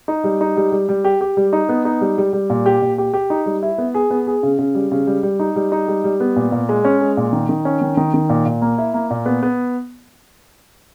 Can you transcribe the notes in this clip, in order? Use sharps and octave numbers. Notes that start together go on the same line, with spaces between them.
D#4
G3
D#4
G3
G3
G3
G4
G4
G3
D#4
B3
D#4
G3
G3
G3
A#2
G4
A#2
G4
G4
D#4
G3
E4
B3
G#4
B3
G#4
C#3
C#3
G3
C#3
G3
G3
D#4
G3
D#4
G3
G3
B3
A#2
A#2
G#3
C#4
G#3
A#2
D#3
D#3
C#4
D#3
D#3
D#3
A#2
A#2
A#3
E4
A#3
A#2
B3
B3